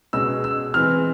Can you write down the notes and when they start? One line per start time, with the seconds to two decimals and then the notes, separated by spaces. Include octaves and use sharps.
0.13 B2 G#3 C#4 E6
0.44 E6
0.74 E3 G#3 C4 F6